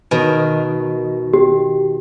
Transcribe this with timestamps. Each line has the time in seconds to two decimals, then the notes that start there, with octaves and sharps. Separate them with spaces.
0.11 B2 D#3
1.34 G4